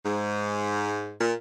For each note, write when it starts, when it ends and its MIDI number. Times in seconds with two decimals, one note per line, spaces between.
0.04 1.14 44
1.19 1.32 46